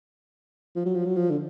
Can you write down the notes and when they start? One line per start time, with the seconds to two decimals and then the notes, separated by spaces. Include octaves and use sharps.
0.76 F3
0.86 F#3
0.95 F3
1.05 F#3
1.16 F3
1.30 D3